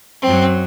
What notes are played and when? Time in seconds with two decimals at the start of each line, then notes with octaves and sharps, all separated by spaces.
0.22 F#2 F#3 C4